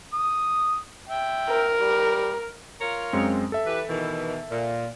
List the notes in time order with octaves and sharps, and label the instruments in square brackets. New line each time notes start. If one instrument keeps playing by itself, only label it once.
[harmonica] D#6
E5 G5
[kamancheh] A#4
[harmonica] G3
[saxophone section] F4 A#4 C#5
[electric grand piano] F#2 G#3 C4
A4 E5
[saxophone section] E3 G4 B4
B2 D#3 E3
A#2